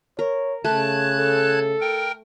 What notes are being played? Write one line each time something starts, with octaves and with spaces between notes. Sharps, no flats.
A#4 C#5
C#3 A3 A5 F#6 G#6
A4
A#4 G5